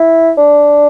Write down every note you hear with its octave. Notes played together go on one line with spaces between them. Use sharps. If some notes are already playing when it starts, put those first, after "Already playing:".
Already playing: E4
D4